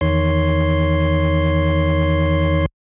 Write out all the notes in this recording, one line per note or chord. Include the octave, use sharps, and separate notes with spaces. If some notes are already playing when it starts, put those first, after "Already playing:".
E2 D#3 C#5 C6